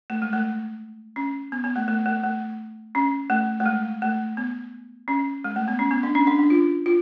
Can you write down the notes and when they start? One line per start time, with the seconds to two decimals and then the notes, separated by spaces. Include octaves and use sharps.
0.10 A3
0.22 G#3
0.33 A3
1.16 C#4
1.52 B3
1.64 B3
1.76 A3
1.88 A3
2.06 A3
2.23 A3
2.95 C#4
3.30 A3
3.60 A3
3.66 G#3
4.02 A3
4.37 B3
5.08 C#4
5.44 G#3
5.56 A3
5.68 B3
5.79 C#4
5.91 B3
6.03 D4
6.15 C#4
6.27 D4
6.39 D4
6.50 F4
6.86 F4